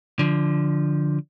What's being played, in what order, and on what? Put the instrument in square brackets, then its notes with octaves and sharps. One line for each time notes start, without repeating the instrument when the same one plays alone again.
[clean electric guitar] D3 F3